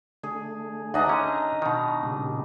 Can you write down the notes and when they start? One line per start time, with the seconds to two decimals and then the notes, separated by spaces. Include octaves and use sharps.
0.24 D3 A3 G#4
0.94 D2 D4 D#4 D#5 F#5
1.09 D3 C#4 A#5
1.62 B2 D#3
2.03 A#2 C#3 G3